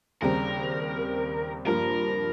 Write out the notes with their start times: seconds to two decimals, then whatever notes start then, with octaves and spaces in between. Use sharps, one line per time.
0.22 D#2 C#3 G3 C4 A#4
1.67 G2 F3 A#3 F4 A#4